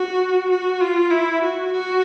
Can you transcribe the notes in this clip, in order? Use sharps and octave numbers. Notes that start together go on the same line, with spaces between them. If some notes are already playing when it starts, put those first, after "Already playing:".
Already playing: F#4
F#4
F4
E4
F#4
F#4